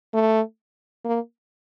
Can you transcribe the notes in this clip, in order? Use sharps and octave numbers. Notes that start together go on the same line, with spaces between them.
A3
A#3